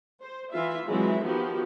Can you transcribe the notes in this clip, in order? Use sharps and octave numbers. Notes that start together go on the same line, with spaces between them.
C5
E3 F4 E5
E3 F#3 G#3 C4 E5
D#3 F3 B3 F#4 G4